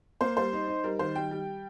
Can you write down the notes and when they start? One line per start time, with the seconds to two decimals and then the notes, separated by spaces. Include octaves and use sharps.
0.21 A#3 C5
0.37 G3 C5
0.53 D#4
0.68 D#4
0.84 G3 A#4
0.99 D#3 C5
1.15 G3 G5
1.31 G3